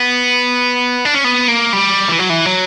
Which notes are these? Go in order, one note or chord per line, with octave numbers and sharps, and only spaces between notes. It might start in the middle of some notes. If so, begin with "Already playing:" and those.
Already playing: B3
D4
C#4
B3
A#3
G3
E3
F#3
E3
F#3